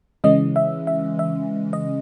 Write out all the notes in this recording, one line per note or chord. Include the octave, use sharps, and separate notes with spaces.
C#3 E3 G#3 C#4 D#5
E5
E5
E5
D#5